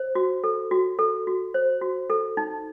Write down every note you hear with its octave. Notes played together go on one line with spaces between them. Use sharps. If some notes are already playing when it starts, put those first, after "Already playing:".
Already playing: C5
F#4
A4
F#4
A4
F#4
C5
F#4
A4
D#4